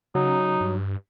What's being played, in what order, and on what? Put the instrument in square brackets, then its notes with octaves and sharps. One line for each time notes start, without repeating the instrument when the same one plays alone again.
[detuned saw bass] C#3 [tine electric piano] F#3 [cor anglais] D#4
[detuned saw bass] G2